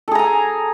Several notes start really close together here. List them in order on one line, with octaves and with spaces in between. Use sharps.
A4 G#4 A#5 G#5